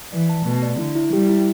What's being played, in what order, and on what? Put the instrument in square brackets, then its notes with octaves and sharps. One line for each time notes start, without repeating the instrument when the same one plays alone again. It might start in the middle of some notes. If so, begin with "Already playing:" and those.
[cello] E3 [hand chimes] D5
[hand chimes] A5
[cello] B2 [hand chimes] A3
[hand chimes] D5
[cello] D3 [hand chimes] E4
[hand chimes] E4
[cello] G3 [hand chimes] G4
[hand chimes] E4